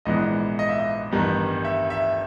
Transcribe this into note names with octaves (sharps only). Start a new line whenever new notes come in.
A#1 G#2 E3 G#3 B3 D#5
D#5
E5
D#5
A1 G2 D#3 G3 B3
E5
E5